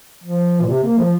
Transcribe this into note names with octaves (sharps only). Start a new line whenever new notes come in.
F3
A#2
C3
A#3
F3